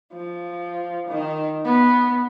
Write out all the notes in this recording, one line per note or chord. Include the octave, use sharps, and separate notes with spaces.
F3
D#3
B3